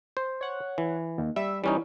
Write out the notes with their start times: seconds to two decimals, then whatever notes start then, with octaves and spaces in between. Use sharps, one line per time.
0.17 C5
0.41 C#5 F#5
0.78 E3
1.18 D#2
1.36 G3 E5
1.64 E3 G3 C#4 D#4